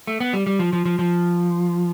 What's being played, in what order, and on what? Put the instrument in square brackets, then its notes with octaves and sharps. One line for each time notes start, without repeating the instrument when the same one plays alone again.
[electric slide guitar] A3
B3
G3
G3
F3
F3
F3
F3